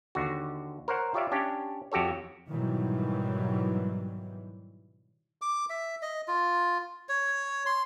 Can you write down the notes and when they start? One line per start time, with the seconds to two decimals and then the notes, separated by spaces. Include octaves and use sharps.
0.15 D#2 D3 F#4
0.88 A#4 C5 C#5 F#5
1.14 F4 G4 C#5 D5 E5 F5
1.32 C#4 D4 G4
1.92 F2 F#4 G4 A4 C#5
2.48 G#2 B2 D#3 E3 F#3 G3
5.42 D6
5.70 E5
6.02 D#5
6.28 F4
7.09 C#5
7.66 C6